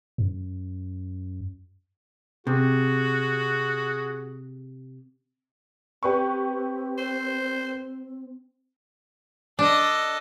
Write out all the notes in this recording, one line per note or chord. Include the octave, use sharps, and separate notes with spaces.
F#2
C3 F#4 G#4
C4 G4 B4 C#6
C5
D4 A4 D#5